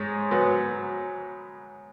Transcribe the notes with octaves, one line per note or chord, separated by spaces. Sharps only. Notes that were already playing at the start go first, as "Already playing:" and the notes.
Already playing: G#2 G#3 C#4
G#2 F#3 B3